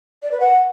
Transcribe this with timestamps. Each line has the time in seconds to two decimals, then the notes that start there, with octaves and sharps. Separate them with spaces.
0.23 D5
0.32 B4
0.40 F#5